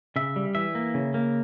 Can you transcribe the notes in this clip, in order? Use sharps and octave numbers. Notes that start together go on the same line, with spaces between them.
C#3 E5
G3
E3 E5
A#3
C#3
A#3